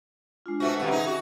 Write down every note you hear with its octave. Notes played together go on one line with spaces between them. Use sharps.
G#3 D4 F4
B2 A3 F#4 C5
G2 C3 E3 C#4 B4 F#5
D#4 G#4 E5
F#4